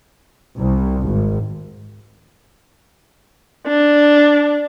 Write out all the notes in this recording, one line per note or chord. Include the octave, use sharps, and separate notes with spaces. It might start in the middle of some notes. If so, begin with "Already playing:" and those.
C2
G#1
D4